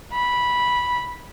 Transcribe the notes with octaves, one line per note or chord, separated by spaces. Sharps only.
B5